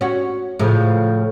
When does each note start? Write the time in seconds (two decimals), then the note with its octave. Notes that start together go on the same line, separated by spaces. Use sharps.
0.01 C#4 F#4
0.59 A2 C#3 F3